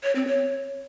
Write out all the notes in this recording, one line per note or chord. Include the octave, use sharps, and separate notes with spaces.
C#5
C4
C#5